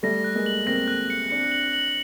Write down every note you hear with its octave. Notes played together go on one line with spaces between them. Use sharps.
G3 A3 A#6
F#6
G#3 A#3
F#7
A#3 C4 A#6
F#6
C#7
C4 D4 C#7
F#7
F#7